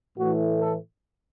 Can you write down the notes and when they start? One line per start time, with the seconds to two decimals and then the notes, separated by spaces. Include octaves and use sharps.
0.17 A2 E3 A3 F#4
0.60 A4